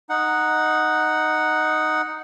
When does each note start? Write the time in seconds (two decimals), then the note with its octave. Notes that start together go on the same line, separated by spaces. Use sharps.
0.09 D#4 F#5